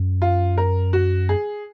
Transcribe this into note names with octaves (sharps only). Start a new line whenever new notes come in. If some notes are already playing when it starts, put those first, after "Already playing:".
Already playing: F#2
F4
A#4
F#4
G#4